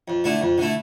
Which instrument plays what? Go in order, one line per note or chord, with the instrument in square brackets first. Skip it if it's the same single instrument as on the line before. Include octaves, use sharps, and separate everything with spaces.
[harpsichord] F2
D3 A3 E4
F2
D3 A3 E4